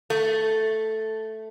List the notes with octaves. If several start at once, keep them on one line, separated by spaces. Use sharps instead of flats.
A3